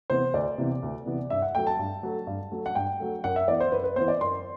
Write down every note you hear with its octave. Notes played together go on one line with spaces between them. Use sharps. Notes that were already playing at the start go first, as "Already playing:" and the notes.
C3 E3 B3 C5
D2 D5
C3 E3 B3
D2
C3 E3 B3
G2 E5
F#5
F#3 A3 G5
A5
G2
F#3 A3
G2
F#3 A3
F#5
G2 G5
F#3 A3
F#2 F#5
E5
E3 B3 D5
C5
F#2 B4
B4
E3 B3 C5
D5
F#2 C6